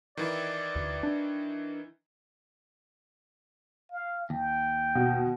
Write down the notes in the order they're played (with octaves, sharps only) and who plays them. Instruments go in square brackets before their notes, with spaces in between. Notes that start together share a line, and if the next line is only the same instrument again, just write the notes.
[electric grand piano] D#3 E3 E4 [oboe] D5
[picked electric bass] D2
D4
[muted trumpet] F5
[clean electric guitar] D#2 [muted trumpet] G5
[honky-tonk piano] B2